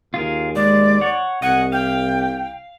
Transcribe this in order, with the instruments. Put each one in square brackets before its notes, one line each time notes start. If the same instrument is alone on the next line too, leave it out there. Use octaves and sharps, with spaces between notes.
[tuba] D#2 [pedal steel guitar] F4 G#4 A#4
[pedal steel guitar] G#3 [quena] D5
[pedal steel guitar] C#5 F#5
[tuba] C2 [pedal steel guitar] D#5 G#5 [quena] F#5
[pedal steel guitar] F5 [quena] G5